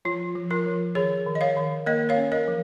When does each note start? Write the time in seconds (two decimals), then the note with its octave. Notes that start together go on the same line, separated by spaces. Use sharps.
0.05 F3 F4
0.35 F3
0.51 F4 A#4
0.66 F3
0.95 D#3 G#4 C#5
1.26 D#3
1.35 D#5
1.41 C#5 F5
1.57 D#3
1.86 A#3 A#4 D#5
2.09 C#5 F5
2.16 C#4
2.32 A#4 D#5
2.48 F3